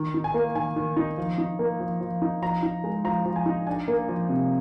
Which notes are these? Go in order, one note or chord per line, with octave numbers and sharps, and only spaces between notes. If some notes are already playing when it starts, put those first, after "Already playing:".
Already playing: D#3
D#4
G#5
A#3
D#3 G#5
D#3
D#4
F3
D#4
A#3
F3
F3
D#4
F3 A#5
D#4
G#3
F3 A#5
F3
G#5
D#4
D4 G#5
A#3
F3
C3